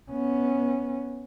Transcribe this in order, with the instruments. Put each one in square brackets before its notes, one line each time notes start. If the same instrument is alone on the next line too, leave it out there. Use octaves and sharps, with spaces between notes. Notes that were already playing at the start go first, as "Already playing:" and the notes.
[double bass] B3 C#4